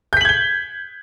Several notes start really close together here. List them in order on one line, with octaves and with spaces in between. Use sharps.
G6 B6 F#7 G#6 G7